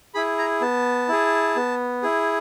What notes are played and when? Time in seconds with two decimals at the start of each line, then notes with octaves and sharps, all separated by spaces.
0.14 E4 G#4 B5
0.39 A#5
0.61 B3 A5
1.09 E4 G#4
1.56 B3
2.03 E4 G#4